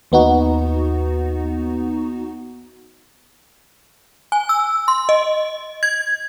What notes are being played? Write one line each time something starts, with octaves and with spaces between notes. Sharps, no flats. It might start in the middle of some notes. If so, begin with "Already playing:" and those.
D#2 B3 D#4 F#4
G#5
E6
C6
D#5
G#6